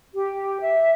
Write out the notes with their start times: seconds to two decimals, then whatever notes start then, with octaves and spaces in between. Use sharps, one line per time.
0.13 G4
0.60 E5